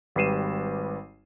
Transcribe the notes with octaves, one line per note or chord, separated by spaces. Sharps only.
G#1 G3 B4 C7 D#7 E7